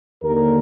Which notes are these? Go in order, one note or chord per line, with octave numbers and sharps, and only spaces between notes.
D#2 D3 A#4